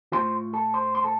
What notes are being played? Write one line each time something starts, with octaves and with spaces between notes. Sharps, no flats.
A2 A3 F4 C5 C6
A4 A5
C5 C6
C6
A4 A5